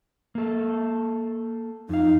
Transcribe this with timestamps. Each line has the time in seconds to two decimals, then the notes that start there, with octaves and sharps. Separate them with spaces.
0.35 A#3 A4
1.89 F2 D#4 F5